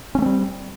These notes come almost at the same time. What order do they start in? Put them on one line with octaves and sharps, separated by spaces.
C#4 A3 C4 G3